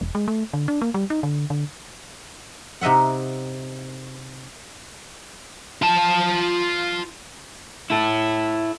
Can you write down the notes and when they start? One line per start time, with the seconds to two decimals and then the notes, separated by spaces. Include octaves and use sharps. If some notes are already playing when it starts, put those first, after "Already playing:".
0.01 E1
0.15 G#3
0.28 A3
0.53 D3
0.68 D4
0.82 A#3
0.94 G3
1.10 D#4
1.23 D3
1.50 D3
2.81 C3 D#4 D#5 E5 F#5
5.82 F4 A5
7.90 E4 A4